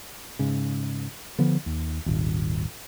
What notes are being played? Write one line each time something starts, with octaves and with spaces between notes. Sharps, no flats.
G#2 C#3
D3 F3 B3
D#2
D#1 G#1